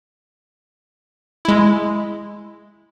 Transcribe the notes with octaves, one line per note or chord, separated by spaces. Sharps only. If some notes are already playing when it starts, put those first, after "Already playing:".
G#3 E4